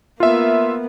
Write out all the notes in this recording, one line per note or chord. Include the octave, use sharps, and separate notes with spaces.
A#3 B3 F4 E5